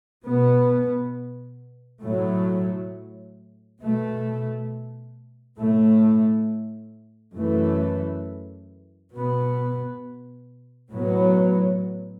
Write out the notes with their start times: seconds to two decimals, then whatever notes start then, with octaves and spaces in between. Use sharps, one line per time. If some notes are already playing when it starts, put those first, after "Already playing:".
0.24 B2 B3
2.02 A2 F#3 A3
3.80 B2 A3
5.57 A2 A3
7.35 F#2 E3 A3
9.13 B2 B3
10.91 A2 F#3 B3